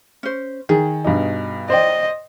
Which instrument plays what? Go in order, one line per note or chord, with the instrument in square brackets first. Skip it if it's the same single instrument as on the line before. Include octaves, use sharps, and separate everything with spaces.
[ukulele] C#4 C5
[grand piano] D#3 [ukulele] G#4
[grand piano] G2 B2 D#4
[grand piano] C5 D5 G5 [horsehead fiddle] D#5